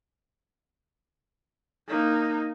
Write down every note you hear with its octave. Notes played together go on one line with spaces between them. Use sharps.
A#3 D#4